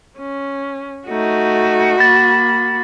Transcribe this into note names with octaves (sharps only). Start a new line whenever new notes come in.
C#4
A3 D#4 F#4
A#3 B5 A6